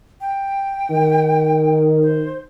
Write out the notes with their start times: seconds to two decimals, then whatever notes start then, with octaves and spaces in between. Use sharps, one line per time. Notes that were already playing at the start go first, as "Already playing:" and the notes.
0.21 G5
0.90 D#3
2.02 C5